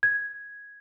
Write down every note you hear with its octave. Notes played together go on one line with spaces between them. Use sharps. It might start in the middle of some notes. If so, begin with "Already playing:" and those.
G#6